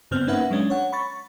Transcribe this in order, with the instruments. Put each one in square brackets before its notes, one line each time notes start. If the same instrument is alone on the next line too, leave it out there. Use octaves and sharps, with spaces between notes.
[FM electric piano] G2 C#3 B3 C4 F6
A#3 C#4 D#4 B4 E5 F#5
F#3 G#3 C#4 D4
C#5 F#5
B5 C#6 A6